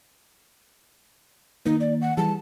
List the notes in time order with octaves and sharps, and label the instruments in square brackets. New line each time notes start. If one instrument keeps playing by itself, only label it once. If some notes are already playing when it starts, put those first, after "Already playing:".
[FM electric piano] D#3 A#3 [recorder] D#4
[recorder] D5
F#5
[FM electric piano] E3 G3 G#4 [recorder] A5